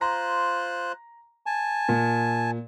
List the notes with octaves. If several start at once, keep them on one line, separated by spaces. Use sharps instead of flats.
F4 C5 A#5 F#6
G#5 A5
A#2